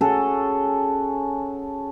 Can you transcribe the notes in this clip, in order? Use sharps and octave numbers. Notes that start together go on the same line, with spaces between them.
C#4 F#4 G#4 A4